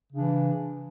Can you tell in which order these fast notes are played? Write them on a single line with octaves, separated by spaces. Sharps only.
C#3 D4 E3